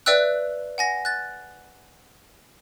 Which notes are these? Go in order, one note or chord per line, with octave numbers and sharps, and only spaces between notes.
B4 D5 E5 G5 E6 F#6
F#5 G#5 A#6
F#6 A6